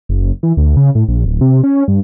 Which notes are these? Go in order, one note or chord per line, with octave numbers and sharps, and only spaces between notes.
F#1
E3
D2
C#3
A2
A#1
D1
C3
C#4
G2